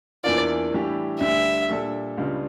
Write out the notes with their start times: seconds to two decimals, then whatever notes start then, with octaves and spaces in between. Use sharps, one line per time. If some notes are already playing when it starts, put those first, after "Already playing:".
0.24 E2 E3 A#3 D4 F4 D5
0.72 A2 E3 G3 D4 G4
1.20 D2 D3 G3 E5
1.69 A#2 G3 D4 A4
2.18 C#2 C#3 G3 D4 F4